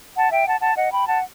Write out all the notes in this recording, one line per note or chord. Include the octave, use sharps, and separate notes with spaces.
F#5 A5
E5 G5
F#5 A5
F#5 A5
D#5 F#5
G5 B5
F#5 A5